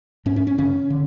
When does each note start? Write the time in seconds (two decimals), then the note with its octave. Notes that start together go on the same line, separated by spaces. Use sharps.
0.26 G#2 C#4
0.36 C#4
0.47 C#4
0.58 F#2 C#3 C#4
0.90 D3